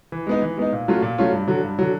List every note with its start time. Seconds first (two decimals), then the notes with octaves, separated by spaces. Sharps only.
0.12 E3
0.27 G#3 B3 D#4
0.42 E3
0.57 G#3 B3 D#4
0.72 A#2
0.88 F#3 A3 C#4 F4
1.02 A#2
1.18 F#3 A3 C#4 F4
1.32 G2
1.48 D3 F#3
1.63 G2
1.79 D3 F#3